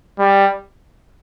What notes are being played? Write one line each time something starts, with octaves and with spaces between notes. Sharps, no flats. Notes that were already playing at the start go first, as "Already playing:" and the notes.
G3